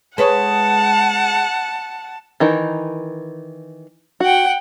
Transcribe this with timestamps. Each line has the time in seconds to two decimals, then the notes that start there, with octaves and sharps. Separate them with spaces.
0.18 G#3 B4 C#5 F#5 A5
2.40 D#3 E3 D#4
4.20 F#4 F#5 G5